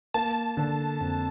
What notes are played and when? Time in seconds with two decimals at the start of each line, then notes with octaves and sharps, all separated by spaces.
0.14 A#3 A5
0.57 D3
1.00 F2